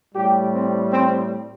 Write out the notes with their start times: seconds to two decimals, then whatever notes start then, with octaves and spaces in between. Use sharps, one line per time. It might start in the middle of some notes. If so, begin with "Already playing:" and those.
0.14 A2 G3 G4
0.53 C4
0.91 C4